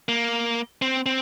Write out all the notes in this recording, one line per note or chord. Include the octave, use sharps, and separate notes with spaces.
A#3
C4
C4